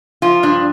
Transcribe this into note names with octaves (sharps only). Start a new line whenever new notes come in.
F3 F4
G2 D4